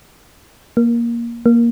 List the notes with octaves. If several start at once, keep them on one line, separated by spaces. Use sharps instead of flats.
A#3
A#3